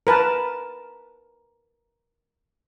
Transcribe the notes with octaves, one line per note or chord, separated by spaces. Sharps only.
A#4 B4 A5